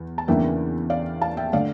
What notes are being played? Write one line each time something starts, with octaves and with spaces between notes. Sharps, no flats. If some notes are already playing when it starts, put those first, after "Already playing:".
Already playing: E2
A5
E2 C#3 E3 A#3 D4 E5 G5
D5 F5
F5 A5
E5 G5
D3 A3 D5 F5